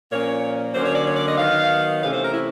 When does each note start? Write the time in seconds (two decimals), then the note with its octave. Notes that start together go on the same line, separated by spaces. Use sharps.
0.11 A#2 F3 A#3 C#4 C#5
0.74 D3 F#3 A#3 C#4 C5
0.84 C#5
0.95 D5
1.06 C#5
1.16 D5
1.27 D#5
1.38 D#3 F#3 B3 F5
2.02 C3 E3 A3 C#4 F5
2.12 C5
2.23 A#4
2.33 E4